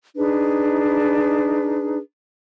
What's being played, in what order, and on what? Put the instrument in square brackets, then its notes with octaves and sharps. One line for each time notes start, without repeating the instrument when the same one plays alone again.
[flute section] D4 D#4 G#4 B4